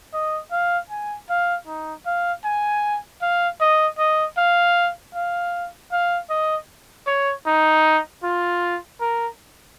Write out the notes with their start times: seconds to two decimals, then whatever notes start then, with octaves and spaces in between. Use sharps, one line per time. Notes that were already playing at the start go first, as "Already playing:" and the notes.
0.13 D#5
0.51 F5
0.90 G#5
1.29 F5
1.67 D#4
2.06 F5
2.44 G#5
3.22 F5
3.60 D#5
3.98 D#5
4.37 F5
5.15 F5
5.92 F5
6.30 D#5
7.07 C#5
7.46 D#4
8.23 F4
9.00 A#4